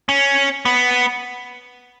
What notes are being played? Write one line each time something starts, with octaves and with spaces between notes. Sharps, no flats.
C#4
B3